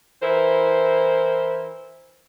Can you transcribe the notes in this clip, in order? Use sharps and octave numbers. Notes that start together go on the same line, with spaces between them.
E3 E4 A#4 C5